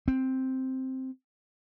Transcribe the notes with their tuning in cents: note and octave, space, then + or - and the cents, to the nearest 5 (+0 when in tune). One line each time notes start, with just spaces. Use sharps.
C4 +0